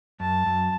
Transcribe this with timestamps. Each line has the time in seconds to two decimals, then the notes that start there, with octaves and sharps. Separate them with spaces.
0.20 F#2 A5
0.46 F#2